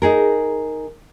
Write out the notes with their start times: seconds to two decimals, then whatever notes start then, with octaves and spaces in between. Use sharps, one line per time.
0.02 D#4 G#4 A#4